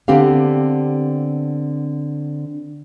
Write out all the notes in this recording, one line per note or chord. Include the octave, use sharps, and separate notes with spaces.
D3 B3 C4 G4 F5